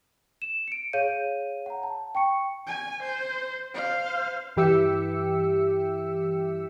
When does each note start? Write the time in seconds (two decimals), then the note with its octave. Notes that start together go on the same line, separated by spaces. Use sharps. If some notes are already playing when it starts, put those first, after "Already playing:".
0.42 E7
0.68 C#7 D7
0.93 G#4 C#5 F5 G6 D#7
1.66 F#5 A#5
1.83 A5
2.15 G5 C#6 C#7
2.67 G#5
3.02 C5
3.75 C5 F5
4.56 G2 E3 G4 E5 E6 C#7